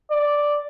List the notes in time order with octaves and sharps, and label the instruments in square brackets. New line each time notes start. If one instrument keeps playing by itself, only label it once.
[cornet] D5